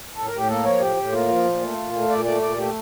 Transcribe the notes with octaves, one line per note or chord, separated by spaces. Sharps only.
A2 A4
A#4
A2 G4
A#3 A4
F3 C#5
A2 G4
A2
A#3 F4
F3
A#2
A3
A#2
A3
A#2 D5
A3 D5
A#2 D5
A3 G4